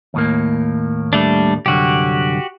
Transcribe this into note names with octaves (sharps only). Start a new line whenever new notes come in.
D#2 A2 A#3
G3 A3 D4
C2 F#2 D3 F#4 G4